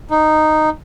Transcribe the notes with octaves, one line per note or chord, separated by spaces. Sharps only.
D#4